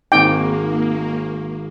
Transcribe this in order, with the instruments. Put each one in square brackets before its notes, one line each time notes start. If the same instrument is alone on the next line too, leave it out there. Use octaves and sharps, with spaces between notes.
[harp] G#1 D6 [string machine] A#3 [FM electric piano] C4 D#4 G#4 [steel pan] G5